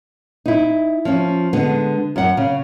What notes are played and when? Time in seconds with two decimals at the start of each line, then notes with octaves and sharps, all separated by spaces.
0.46 D#4 E4
1.05 F3 C#4
1.53 D3 G#3 B3
2.16 F#2 F#5
2.37 C#3